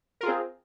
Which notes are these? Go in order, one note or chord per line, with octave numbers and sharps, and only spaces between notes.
C4 F4 G#4 A#4